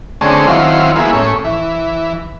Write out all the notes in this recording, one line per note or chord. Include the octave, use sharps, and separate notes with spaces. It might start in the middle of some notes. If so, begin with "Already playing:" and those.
D3 G#3 A3 C4 C#4
D#3 F#3 C4 E4 F4
G#3 A#3 B3 E4
A2 C#4
E3